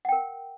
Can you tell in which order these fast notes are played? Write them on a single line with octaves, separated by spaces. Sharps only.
F#5 G5 A#4